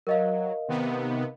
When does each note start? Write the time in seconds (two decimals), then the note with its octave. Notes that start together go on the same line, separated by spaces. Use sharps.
0.07 F#3 A#4 D#5 F5
0.68 C3 D#3 B3